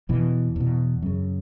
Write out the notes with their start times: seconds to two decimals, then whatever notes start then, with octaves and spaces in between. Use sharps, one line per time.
0.09 E2 B2 E3
0.56 E2 B2
1.02 F#2 C#3